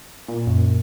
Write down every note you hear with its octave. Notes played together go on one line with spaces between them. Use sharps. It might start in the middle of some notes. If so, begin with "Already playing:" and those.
A#2
F#2